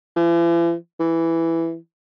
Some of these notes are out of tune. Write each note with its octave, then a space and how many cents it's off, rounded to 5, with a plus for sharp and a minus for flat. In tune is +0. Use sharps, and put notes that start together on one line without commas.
E3 +45
E3 +5